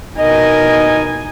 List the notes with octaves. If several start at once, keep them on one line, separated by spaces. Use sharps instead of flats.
B2 D#4 A#4 D#5 G#5